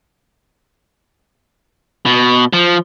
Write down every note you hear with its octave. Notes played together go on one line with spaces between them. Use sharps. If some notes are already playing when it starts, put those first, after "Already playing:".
B2
F3